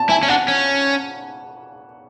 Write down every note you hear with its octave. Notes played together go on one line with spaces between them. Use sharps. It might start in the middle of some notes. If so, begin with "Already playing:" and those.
Already playing: A5
E4 G#5
C#4
D4 F#5
C#4